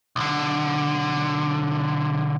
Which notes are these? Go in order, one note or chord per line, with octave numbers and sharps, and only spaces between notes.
B1 D3